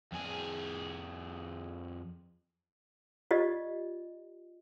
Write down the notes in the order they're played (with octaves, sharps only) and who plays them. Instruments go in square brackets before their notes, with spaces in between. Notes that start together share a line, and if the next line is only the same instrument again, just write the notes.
[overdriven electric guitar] F2 G#4
[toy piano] F4 G4 D5 D#5